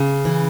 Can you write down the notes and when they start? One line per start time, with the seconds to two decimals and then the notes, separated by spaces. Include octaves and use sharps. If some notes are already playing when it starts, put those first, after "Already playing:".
Already playing: C#3
0.25 E3